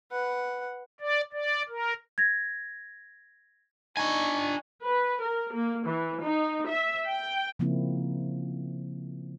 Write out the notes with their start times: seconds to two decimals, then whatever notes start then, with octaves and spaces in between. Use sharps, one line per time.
0.11 B4 F#5
1.00 D5
1.33 D5
1.69 A#4
2.18 G#6 A#6
3.97 D4 D#4 G#5 C#6
4.84 B4
5.20 A#4
5.51 A#3
5.84 E3
6.22 D#4
6.66 E5
7.06 G5
7.59 C#3 F3 A#3 C4 E4